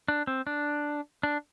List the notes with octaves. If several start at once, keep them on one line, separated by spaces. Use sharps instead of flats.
D4
C4
D4
D4